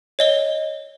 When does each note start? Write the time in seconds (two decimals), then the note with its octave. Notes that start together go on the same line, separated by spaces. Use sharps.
0.19 C#5 D#5 G7